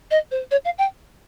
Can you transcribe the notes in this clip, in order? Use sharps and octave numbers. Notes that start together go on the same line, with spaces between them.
D#5
C5
C#5
F5
G5